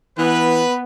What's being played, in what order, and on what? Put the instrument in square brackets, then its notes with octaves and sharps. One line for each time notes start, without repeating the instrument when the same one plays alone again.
[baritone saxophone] E3 [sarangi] B3 [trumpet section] B4